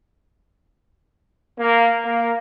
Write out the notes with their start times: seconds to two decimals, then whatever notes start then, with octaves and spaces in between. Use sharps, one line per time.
1.58 A#3
2.04 A#3